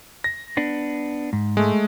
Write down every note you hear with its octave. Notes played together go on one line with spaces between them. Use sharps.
A#6
B3 D4
G#2
G#3 A3